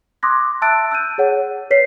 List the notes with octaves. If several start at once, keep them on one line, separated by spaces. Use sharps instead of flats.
C6 D6 D#6 F#6 G#6 A#6
E5 A5 E6 F#6 A6 D7
E6 F#6 G6 D#7
G#4 C#5 F#5
B4 C#5 B6 C7